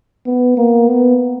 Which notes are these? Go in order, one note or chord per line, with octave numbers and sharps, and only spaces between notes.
B3
A#3
B3